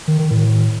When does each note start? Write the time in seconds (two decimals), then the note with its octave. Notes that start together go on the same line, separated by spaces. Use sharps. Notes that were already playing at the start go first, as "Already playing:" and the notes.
0.08 D#3
0.19 D#3
0.31 A2